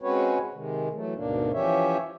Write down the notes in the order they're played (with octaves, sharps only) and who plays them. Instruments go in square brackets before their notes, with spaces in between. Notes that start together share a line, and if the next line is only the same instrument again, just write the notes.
[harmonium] G#3 C4 C#4 F#4 B4 C#5
C3 D#3 G#3
E3 F#3 A3
D2 G#2 B2 A#3 D4
E3 F3 C#4 G4 C#5 E5